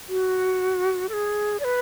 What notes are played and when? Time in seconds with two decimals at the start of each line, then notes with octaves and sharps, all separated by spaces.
0.09 F#4
1.09 A4
1.13 G#4
1.60 D5
1.64 B4